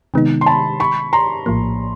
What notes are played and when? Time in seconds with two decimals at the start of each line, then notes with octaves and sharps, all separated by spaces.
0.14 C3 D#3 G#3 B3 D#4
0.41 C6
0.46 A5 B5
0.80 B5 C#6
1.13 A#5 C6
1.46 A#1 A2 F3 A#3